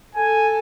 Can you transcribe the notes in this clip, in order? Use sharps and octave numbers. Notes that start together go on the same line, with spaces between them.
A4 G#5